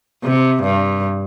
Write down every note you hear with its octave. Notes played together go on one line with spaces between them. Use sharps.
C3
G2